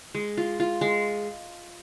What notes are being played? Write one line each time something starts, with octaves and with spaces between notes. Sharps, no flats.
G#3
F4
F4
G#3